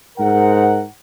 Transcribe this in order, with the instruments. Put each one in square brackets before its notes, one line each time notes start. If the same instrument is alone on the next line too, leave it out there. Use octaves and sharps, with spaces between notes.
[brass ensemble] G#2 A#4 F#5